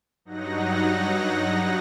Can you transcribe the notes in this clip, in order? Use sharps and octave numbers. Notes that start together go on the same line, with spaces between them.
G2 F#3 D#4 F#5 A#6